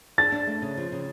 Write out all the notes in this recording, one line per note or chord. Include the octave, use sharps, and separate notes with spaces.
D4 A6
D4
A3
C#3
F3
C#3